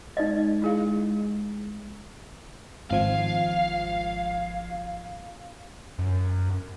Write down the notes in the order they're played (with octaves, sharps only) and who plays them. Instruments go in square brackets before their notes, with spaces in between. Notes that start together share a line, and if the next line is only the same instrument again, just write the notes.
[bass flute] G#3 [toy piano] D#4 D5 D#5
[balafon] E4 G#4 F5
[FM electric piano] G#1 F3 G#6 [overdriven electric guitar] F5
[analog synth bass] F#2